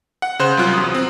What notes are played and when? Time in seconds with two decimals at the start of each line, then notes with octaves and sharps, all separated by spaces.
0.22 F#5
0.39 C#3 C5 F#6
0.57 C2 F#3 F4 F#6
0.74 E2 D#6
0.95 C4